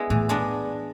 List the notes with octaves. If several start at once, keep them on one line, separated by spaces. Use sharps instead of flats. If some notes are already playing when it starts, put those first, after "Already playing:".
Already playing: G#3 B3 E4
A2 E3
G#3 B3 D4